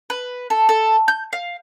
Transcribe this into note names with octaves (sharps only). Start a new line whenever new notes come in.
B4
A4
A4
G6
F5